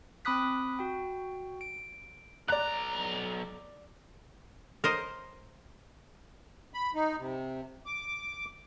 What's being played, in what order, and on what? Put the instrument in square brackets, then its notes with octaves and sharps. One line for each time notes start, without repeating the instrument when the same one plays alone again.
[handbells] C4 B5 D6 D#6 F#6 B6
F#4 G5
D7
[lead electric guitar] B1 A#5 [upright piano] D5 F#6
[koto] A#4 C5 D#5
[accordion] B5
D#4
C3
D6